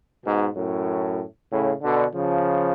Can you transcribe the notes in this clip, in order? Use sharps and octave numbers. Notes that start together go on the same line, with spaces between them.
G#2 B2
F#2 A2
A2 C#3
B2 D3
C#3 F3